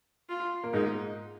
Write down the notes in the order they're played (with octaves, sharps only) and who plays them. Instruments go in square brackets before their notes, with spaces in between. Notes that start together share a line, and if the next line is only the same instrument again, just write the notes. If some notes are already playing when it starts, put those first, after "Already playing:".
[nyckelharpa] F4
[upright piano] A#3
[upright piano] G#2 G#3 [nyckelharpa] D#4